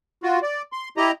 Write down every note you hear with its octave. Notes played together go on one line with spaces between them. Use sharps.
F4 F#4
D5
C6
E4 G4 D#5 A#5